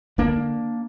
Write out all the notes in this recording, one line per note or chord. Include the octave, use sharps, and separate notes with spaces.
D3 A#3 D4